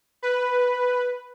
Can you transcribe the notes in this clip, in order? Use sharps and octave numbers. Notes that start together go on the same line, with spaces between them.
B4